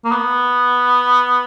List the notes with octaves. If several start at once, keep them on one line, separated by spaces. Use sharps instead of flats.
A#3
B3